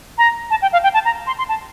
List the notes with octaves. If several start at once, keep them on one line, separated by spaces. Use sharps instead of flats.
A#5
A5
G5
F5
G5
A5
A#5
C6
C6
A5